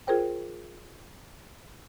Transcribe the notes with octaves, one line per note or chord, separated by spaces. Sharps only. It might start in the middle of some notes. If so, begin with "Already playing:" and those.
F4 G#4 A#4 C5 G5